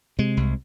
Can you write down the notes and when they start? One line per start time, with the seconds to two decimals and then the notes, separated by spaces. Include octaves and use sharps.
0.19 C3 G#3
0.37 C2